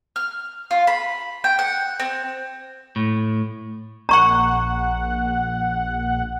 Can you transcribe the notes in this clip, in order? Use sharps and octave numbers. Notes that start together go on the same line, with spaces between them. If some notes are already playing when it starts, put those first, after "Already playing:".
F6
F4
B5
G5
F#5
C4
A2
A#1 F#5 A#5 C#6